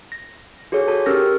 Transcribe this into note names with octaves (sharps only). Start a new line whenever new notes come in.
A#6
F#4 G#4 A4 C#5
F#4 A4 A5
C#4 G4 A#4 E6 F6 A#6